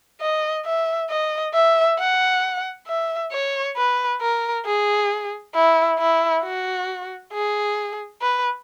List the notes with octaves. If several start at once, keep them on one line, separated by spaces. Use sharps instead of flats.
D#5
E5
D#5
E5
F#5
E5
C#5
B4
A#4
G#4
E4
E4
F#4
G#4
B4